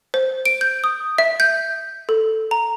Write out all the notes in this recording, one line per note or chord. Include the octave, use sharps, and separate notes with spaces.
C5
D7
G6
D#6
E5
G6
A4
A#5